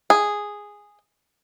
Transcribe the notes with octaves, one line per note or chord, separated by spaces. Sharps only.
G#4